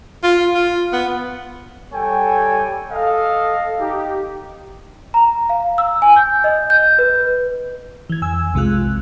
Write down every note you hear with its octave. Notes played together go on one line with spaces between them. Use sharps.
F4
F4
B3
G3 A4 C#5 G5 G#5
A4 D#5 F5
D#4 G4
A#5
F5
E6
G#5
G6
D#5
G6
B4
E3 G#6
F2 G#5 E6
B1 C3 G#3 F4 F#6